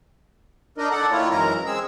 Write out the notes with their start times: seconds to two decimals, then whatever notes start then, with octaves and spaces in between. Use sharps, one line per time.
0.78 D4 D#4 A#4 D#5
0.91 A4 D5 F#5
1.11 D#3 A#3 E4 F4 C#5
1.31 F#2 E3 G#3 A#4 A#5
1.66 G#3 C4 G#4 E6